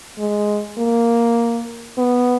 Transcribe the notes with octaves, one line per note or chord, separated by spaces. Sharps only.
G#3
A#3
B3